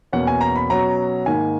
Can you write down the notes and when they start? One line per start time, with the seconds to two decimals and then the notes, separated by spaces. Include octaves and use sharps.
0.12 E2 B2 A#3 C#4 F#5
0.27 G#5
0.41 A#5
0.56 B5
0.70 B2 F#3 C#4 A#5
1.26 G#2 D#3 A#3 G#5